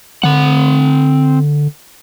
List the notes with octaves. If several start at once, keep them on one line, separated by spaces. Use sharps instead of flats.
D3 C4 F#5